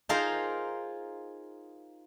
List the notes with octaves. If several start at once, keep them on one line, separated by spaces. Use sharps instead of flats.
D#4 F4 G#4 A#4 C5 F5